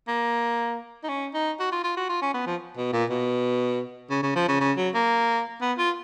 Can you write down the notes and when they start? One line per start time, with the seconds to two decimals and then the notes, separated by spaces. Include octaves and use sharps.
0.08 A#3
1.03 D#4
1.09 C#4
1.34 D#4
1.60 F#4
1.72 F4
1.84 F4
1.97 F#4
2.09 F4
2.22 C#4
2.34 B3
2.47 F3
2.77 B2
2.93 A#2
3.10 B2
4.10 C#3
4.23 C#3
4.36 F3
4.48 C#3
4.61 C#3
4.77 F#3
4.94 A#3
5.61 B3
5.78 F4